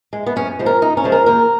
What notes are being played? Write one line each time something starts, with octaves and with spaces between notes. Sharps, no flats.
G#3
B3
F#2 C#4
C#3 F3 G#3
A#4
F#2 D#4
C#4
C#3 F3 G#3
A#4
D#2 A#4